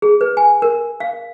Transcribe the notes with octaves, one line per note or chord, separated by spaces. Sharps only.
G#4
B4
G#5
A#4
F5